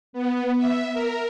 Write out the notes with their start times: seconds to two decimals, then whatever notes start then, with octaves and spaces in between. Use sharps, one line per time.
0.13 B3
0.57 E5
0.93 A#4